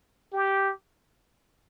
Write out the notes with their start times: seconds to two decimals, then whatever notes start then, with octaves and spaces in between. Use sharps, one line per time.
0.33 G4